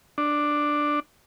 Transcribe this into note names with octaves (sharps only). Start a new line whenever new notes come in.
D4